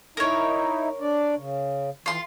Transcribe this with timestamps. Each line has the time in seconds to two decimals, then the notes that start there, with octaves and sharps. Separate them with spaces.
0.17 D#4 E4 A#4 C#5
1.00 D4 D5
1.36 C#3
2.06 E3 F4 C6